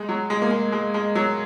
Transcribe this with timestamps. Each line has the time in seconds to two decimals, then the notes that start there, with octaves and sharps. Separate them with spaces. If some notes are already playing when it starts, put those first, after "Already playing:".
Already playing: G#3
0.09 F#3
0.30 G#3
0.42 A#3
0.51 G#3
0.72 G#3
0.94 G#3
1.15 F#3